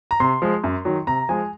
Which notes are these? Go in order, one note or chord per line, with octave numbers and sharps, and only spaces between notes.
A#5
C3 C6
F3 G#3
F#2
D#3 F#3
C3 A#5
F3 G#3 G#5